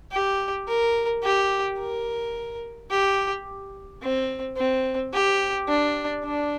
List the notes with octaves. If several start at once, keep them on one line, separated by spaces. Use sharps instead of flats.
G4
A#4
G4
A#4
G4
C4
C4
G4
D4
D4